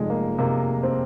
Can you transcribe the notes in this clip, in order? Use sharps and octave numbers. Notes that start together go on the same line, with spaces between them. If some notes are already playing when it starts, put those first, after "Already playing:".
Already playing: F1 F2 G#3
A#3
C3 A#3
C4